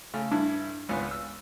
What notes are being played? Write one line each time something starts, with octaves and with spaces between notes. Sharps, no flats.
C#3 A3
G2 D4 E4
G#1 C#2 B3
E6